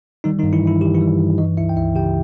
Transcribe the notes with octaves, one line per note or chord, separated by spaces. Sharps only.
D#3 G3 D#4
D#3 D#4
G2
E3 E4
G2 E4
D#3 G4
E3 E4
G3
G2
E3 D#4 D#5
C#2 E4 E5
G5
C#2 E4 E5
C#3 G4 G5